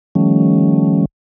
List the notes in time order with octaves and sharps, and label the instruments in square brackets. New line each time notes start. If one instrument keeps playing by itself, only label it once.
[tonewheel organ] D#3 F3 G3 A3 C#4